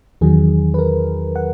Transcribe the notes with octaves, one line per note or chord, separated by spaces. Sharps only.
E2 D#3 F#3 G#4
B4
A#4
F#5